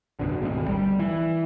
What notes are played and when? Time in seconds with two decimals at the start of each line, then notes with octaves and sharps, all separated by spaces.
0.19 F#2 B2 D3
0.42 G#1 D2 B2
0.68 G3
0.99 E3